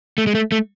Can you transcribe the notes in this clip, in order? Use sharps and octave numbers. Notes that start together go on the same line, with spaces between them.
A3
G#3
A3
A3